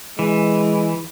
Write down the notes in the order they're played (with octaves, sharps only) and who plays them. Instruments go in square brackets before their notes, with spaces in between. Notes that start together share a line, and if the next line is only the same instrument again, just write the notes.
[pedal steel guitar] E3 [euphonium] G#3